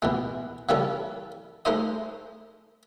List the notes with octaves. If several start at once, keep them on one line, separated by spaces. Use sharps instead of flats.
B2 E3 G#3
C#3 E3 G3 C#4 A4
G#3 A3 D#4 C5 D#5